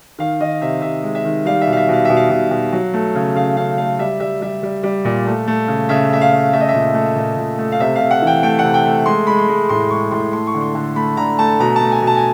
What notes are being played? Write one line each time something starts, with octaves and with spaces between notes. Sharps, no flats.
D#3 F5
D#3 D#5
C3 E5
C3 E5
G#3
E5
D#3
G3 F5
E5
B2
F5
E5
B2 F5
B2 E5
F5
B2
B2
F#3
A3
C#3
C#3 F5
C#3 F5
A3 F5
G3 E5
G3 E5
G3 E5
G3
G3
A#2
A3
A3
C#3
C#3 E5
A3 E5
F5
C#3
A3 E5
D#5
E5
A#2
A3
A#2
A#2
A3
F5
C3 E5
C3 F5
F#5
E3 G5
A3 G5
C3 F#5
G5
A3
G#3 C6
G#3 B5
C6
G#3
A2 C6
G#3 C#6
A2 C6
A3 C6
C#6
D3
C6
D3
A3 B5
D3 A#5
A3 A5
B2 A#5
A5
A3
G#5
B2 A5
G#5